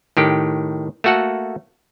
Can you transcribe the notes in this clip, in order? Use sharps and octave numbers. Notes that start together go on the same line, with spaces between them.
A2 D#3 G4
A3 A#3 F#4 A4 F#5